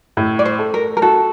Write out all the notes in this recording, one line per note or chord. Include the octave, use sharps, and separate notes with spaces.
A2
D5
C5
A3
A#4
A#4
F#4 A4